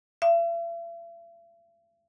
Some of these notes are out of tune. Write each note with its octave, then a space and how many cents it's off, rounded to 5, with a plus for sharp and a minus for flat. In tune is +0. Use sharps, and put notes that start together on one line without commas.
E5 +45